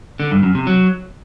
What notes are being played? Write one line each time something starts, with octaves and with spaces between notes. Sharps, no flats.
D3
G2
F#2
C3
F#3